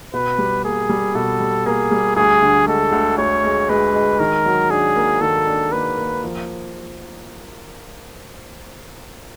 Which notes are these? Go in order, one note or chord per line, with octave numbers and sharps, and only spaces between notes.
B2 B4
G3
A#3 G#4
G3
B2 A4
G3
A#3 G#4
G3
D2 G#4
D3
G#3 A4
D2
D2 C#5
G#3
G#3 B4
G#3
D#3 A#4
F#3
D4 G#4
A#3
D#3 A4
D4
A#3 B4
A#3
F3